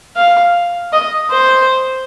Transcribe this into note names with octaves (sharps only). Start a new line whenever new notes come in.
F5
D#5
C5